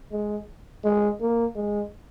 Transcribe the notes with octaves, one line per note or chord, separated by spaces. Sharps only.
G#3
G#3
A#3
G#3